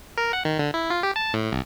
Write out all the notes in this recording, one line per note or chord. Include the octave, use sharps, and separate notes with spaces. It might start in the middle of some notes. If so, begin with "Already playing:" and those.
A#4
F#5
D#3
D3
E4
F4
G4
A5
A2
C2